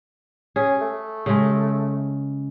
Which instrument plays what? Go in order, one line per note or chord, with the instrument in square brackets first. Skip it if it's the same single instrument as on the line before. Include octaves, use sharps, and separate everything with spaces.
[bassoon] C#4 [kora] G#4
[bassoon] A3
[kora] C#3 G#3